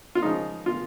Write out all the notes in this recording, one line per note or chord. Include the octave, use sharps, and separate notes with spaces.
F4
C#3 F3 G#3 D#4
F4